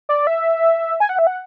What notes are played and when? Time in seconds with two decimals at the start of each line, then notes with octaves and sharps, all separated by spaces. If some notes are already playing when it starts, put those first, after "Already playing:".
0.09 D5
0.27 E5
1.00 G#5
1.09 F#5
1.19 E5
1.27 F#5